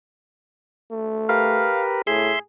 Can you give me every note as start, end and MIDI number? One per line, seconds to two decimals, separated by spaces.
0.91 1.68 57
1.29 2.02 67
1.29 2.02 70
1.29 2.02 71
1.29 1.84 77
2.07 2.33 45
2.07 2.37 68
2.07 2.39 76
2.07 2.39 84